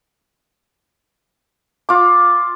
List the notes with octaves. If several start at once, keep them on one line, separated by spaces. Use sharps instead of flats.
F4 D6